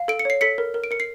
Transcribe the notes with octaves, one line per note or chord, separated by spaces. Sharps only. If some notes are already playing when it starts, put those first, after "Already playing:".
Already playing: F5
A4 D7
C#7
C#5 C7
A4 B6 C#7
A#4
A#4
D7
A#4 C#7
C7